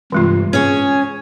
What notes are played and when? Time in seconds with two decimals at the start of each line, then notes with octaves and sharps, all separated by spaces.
0.12 G2 C3 E3 G#3 F4
0.53 C#4 G#4 C#5 G#5